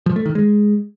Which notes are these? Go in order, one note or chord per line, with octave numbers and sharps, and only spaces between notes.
F3
A3
D#3
G#3